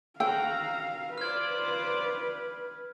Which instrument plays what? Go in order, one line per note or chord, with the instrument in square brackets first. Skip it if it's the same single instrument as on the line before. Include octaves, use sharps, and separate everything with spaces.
[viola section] F#4 A#5 [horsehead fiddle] F5 [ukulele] G5 [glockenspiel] E6
[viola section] F4 C5 D5 [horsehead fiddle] B4 [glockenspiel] F6 G#6